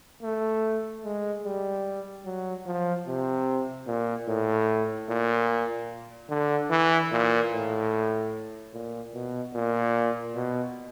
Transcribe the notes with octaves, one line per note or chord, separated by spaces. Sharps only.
A3
G#3
G3
F#3
F3
C3
A#2
A2
A#2
D3
E3
A#2
A2
A#2
B2
A#2
B2